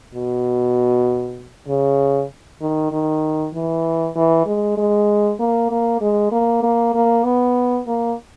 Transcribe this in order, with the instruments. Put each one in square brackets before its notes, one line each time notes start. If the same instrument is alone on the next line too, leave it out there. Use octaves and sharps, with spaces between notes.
[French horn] B2
C#3
D#3
D#3
E3
E3
G#3
G#3
A#3
A#3
G#3
A#3
A#3
A#3
B3
A#3